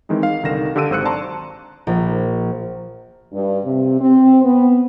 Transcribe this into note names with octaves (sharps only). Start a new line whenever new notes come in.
D#3 E3 G#3 C4 D#4
F5
C2 D3 D#3 A#6 E7
D3 G4 F5 E6 D7 D#7
G#1 F#3 C5 E6 F#6 C#7
D5 A5 A#5 C6 C#6
A#1
G2
C3
C4
B3